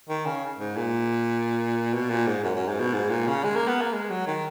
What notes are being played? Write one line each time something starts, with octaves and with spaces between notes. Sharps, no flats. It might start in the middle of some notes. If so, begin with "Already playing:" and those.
D#3
C#3
G#2
A#2
B2
A#2
G#2
F#2
F#2
G#2
B2
G#2
A#2
C#3
G#3
A#3
B3
A#3
G#3
F#3
D#3